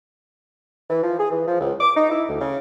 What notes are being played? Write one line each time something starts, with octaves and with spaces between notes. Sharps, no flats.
E3
F3
G#4
E3
F3
C#2
D6
D#4
E4
D2
C#3